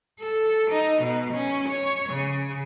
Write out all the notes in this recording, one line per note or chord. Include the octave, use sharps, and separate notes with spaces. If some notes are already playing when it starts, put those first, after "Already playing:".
A4
D#4
B2
C#4
C#5
C#3